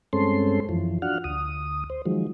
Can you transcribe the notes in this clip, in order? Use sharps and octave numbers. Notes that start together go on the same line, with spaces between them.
G2 G#3 C4 C#4 A4 C6
F#2 E3 F3
D4 F4 F#4 F#5 F6
D2 D#6
C5
D#3 F3 F#3 G#3